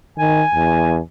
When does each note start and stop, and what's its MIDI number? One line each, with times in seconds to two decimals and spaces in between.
0.18 0.42 51
0.18 0.98 80
0.54 0.99 40